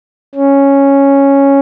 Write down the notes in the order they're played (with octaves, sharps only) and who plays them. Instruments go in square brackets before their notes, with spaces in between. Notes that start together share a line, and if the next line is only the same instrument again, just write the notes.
[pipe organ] C#4